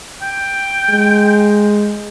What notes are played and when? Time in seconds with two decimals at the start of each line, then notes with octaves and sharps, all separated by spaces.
0.22 G5
0.89 G#3